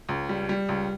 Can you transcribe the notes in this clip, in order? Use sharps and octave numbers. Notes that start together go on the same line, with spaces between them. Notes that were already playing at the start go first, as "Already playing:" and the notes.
C#2
G3
G3
C#2